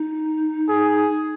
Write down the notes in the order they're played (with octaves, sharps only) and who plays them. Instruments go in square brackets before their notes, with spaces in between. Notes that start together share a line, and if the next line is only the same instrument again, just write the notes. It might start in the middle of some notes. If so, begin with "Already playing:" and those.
Already playing: [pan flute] D#4
[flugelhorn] G#4